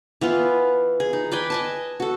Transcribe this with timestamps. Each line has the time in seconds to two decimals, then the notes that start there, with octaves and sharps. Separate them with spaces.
0.21 E3 B3 F4
1.00 G#4
1.13 D#4
1.31 B4 D5 G5 G#5
1.50 D#5 G#5 A5
2.00 F#4 A4